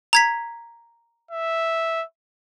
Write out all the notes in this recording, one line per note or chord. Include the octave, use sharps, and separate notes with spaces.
A#5 G#6 B6
E5